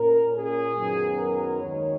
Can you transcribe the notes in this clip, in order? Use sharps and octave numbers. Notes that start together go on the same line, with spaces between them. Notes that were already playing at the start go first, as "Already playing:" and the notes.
Already playing: A#2 A#3 C#4 A#4
G#4
F#2 D#3 F#3 B3
A#4
D#2 D#3 G#3 C#5